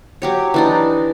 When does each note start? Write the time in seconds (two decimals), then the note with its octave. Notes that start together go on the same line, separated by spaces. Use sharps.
0.22 F#3 G4 C#5
0.54 E3 D4 D#4